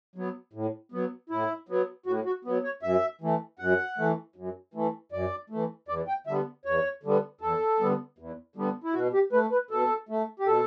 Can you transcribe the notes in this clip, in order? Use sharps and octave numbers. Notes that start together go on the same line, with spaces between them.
F#3 B3
A2
F#3 B3
A2 E4
F#3 B3
A2 F#4
F#4
F#3 B3
C#5
F#2 E5
E3 A3
F#2 F#5
E3 A3
F#2
E3 A3
F#2 D5
E3 A3
E2 D5
G5
D3 G3 B3 E5
E2 C#5
D3 G3 B3
E2 A4
D3 G3 B3
E2
D3 G3 B3
E4
B2 F#4
G4
A3 B4
B4
B2 A4
A3
G4
B2 A4